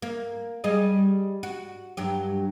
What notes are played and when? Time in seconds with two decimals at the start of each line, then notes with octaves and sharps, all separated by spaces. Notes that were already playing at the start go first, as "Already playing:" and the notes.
0.02 A#3
0.64 G3 G#4 D#5
1.43 F#4
1.97 G2 F#3 G4